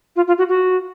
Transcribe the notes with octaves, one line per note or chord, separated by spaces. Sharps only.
F4
F4
F#4
F#4